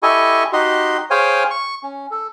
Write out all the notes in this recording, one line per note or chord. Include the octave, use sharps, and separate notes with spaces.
E4 G4 A4 D#5 G#5 C#6
D#4 F#4 G4 D#5 C6
G#4 C5 C#5 F5 G5 G#5
C#6
C#4
A4